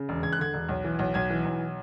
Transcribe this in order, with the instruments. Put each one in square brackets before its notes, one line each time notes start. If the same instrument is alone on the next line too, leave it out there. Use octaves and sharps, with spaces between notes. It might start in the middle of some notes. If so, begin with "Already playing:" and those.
Already playing: [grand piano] C#3
E1
E1 G#6
F#6
D3 G#6
E1
B1
E3
B1
B1 G#6
E3
B1